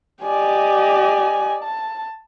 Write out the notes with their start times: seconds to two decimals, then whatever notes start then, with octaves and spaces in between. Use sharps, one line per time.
0.23 G4 D5 D#5 G#5
1.63 A5